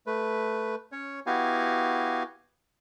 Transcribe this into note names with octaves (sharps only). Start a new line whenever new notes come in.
A3 B4
C#4 C#5
B3 E4 F#4 G4 F5 G#5